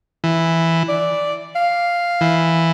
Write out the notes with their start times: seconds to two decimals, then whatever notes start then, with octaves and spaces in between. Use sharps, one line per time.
0.24 E3
0.89 D5
1.56 F5
2.21 E3